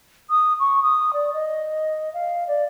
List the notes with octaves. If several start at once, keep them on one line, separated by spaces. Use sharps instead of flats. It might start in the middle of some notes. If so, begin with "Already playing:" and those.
D#6
C#6
D#6
D5
D#5
F5
D5